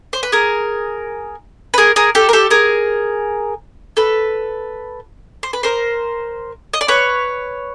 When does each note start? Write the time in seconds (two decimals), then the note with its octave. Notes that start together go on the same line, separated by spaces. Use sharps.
0.13 C5
0.23 B4
0.32 G#4 A#4
1.74 B4
1.78 G#4 A#4
1.96 G#4 A#4
2.15 G4 A4
2.29 A#4
2.33 G4 A4
2.51 G#4 A#4
3.97 A4 B4
5.43 C5
5.53 B4
5.63 A#4 C5
6.73 D#5
6.81 D5
6.88 B4 C#5